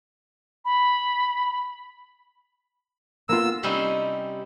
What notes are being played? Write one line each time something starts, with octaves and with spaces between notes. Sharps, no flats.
B5
A#3 B3 F4 E6
C3 G3 C4 C#4 D#4 E4